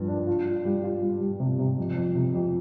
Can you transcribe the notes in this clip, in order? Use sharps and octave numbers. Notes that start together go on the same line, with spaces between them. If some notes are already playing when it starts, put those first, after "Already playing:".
Already playing: G2 F3
D4
F4
F4
G3
F4
G3
G3
C3
C3
F2
F2
C3
F2